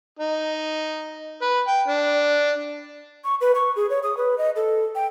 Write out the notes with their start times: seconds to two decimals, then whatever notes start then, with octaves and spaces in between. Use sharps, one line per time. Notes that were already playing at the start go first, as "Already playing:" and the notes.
0.19 D#4
1.42 B4
1.68 G5
1.88 D4
3.24 C#6
3.41 B4
3.55 C#6
3.76 G#4
3.90 C#5
4.03 D#6
4.17 B4
4.38 D#5
4.56 A4
4.95 G5